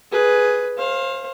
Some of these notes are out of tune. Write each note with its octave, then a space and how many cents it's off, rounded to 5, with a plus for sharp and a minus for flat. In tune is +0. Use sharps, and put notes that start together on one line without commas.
G#4 +5 B4 +0
C5 +35 F5 +0